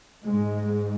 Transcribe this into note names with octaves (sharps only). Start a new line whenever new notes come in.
G#2 G#3